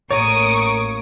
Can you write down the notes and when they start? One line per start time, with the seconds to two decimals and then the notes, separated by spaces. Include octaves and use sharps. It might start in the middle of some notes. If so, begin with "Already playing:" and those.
0.11 A1 A#3 C#5 A#5 C#6 D#6 D7